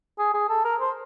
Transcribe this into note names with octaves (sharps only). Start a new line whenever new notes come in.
G#4
G#4
A4
A#4
C5